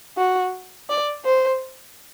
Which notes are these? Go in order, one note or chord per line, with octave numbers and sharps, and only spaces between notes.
F#4
D5
C5